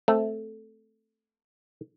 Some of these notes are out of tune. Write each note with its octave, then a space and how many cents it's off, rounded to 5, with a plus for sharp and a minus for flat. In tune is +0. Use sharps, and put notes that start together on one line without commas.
A3 +0 C4 +0